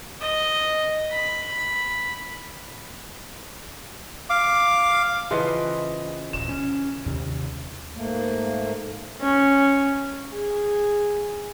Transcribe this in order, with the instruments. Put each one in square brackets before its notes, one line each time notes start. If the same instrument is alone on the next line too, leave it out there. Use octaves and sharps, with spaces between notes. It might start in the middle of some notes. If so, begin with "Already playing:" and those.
[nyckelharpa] D#5
B5
[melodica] F5 D6
[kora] C#3 E3 F3 [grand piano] B4 D#5 C6
[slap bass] D1 [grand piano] E7
[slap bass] C#4
D#2 C3 D#3
[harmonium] G#2 A3 A#3
[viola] C#4
G#4